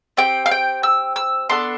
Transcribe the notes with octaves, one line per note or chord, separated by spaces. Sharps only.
C4 G4 G5
F5
G5
E6
E6
B3 D4 A4 C6